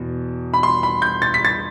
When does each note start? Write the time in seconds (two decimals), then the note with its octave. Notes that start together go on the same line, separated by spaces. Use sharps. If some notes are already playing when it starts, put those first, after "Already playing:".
Already playing: E2 B2
0.54 B5
0.63 C6
0.83 B5
1.02 G6
1.22 A6
1.34 B6
1.45 A6